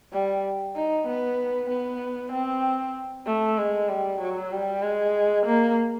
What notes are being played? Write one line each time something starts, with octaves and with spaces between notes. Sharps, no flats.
G3
D#4
B3
B3
C4
A3
G#3
G3
F#3
G3
G#3
A#3